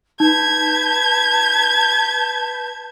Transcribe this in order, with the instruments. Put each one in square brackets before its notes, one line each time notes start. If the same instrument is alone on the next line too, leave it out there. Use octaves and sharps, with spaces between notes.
[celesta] D#4 [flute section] B4 A5 G6 [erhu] G#6